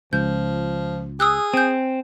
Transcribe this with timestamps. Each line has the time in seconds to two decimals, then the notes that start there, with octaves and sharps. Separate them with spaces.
0.13 C#2 F3 G6
1.20 G#4 D#6 E6 F#6
1.54 C4 G#5 G6